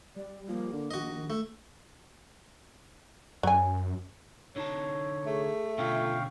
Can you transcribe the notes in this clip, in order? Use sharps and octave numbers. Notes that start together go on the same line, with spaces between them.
G3 D5
F3 A#3
D3
A#1 D#3 F#4 D#5
A3
F#2 F#3 G#5
D3 D#4 C#5 A5
A3 G#4
B2 D3 C#4 F4 F5 G5 C#6